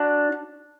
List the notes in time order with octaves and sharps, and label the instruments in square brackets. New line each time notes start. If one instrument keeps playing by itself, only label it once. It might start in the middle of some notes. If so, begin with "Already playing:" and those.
Already playing: [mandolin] D4 F#4